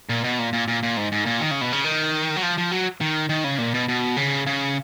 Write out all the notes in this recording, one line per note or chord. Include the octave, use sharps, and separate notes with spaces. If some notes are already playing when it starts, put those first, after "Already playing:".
A#2
B2
A#2
A#2
A#2
A#2
G#2
G#2
A#2
D#3
C#3
B2
C#3
D#3
F#3
F3
F3
F#3
D#3
D#3
C#3
A#2
B2
B2
C#3
C#3